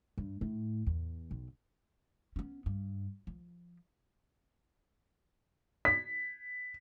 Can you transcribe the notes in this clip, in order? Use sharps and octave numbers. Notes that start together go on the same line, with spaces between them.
G2
A2
E2
B1
B3 C#4
G2
F3
B6